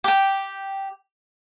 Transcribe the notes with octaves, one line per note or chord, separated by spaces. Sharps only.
G4 G5